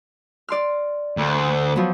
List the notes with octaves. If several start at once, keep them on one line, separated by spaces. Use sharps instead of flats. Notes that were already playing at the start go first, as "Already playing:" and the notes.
D5 C6 F6
D2
F3 F#3 B3